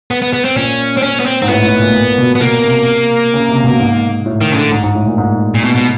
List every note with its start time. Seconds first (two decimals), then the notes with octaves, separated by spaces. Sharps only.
0.11 B3
0.22 B3
0.33 B3
0.45 C4
0.56 A#2 C#4
0.97 C4
1.03 C#4
1.20 B3
1.26 C4
1.42 G#2 C4
1.49 A2 B3
1.64 A2
1.79 A#2
1.94 A#2
2.18 B2
2.35 B3
2.41 B2 A#3
2.64 C3
3.34 C#3
3.49 C3
3.64 B2
3.79 G#2
4.26 A2
4.41 D#3
4.52 C#3
4.56 D3
4.72 G#2
4.84 G#2
4.95 A2
5.06 A#2
5.18 G#2
5.55 A#2
5.64 B2
5.75 B2